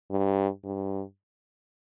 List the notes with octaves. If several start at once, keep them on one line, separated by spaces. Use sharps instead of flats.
G2
G2